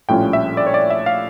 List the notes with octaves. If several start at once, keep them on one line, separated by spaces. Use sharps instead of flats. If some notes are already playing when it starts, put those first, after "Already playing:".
A#1 A2 G3 C#4 F4 G5
E5
D5
C#5
D5
E5
F5